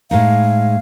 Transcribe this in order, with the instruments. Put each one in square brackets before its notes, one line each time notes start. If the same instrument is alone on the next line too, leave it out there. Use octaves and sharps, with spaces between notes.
[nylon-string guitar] A2 G#3 D#4 [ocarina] F5